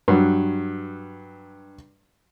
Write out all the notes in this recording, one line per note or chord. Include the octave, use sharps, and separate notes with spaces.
G2 F#3